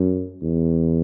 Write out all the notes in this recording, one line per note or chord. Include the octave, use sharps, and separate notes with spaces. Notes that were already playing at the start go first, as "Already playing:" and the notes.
Already playing: F#2
E2